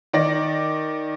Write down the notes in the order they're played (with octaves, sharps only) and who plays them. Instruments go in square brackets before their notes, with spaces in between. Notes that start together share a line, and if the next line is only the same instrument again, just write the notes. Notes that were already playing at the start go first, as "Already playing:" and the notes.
[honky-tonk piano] D#3 D5 A#6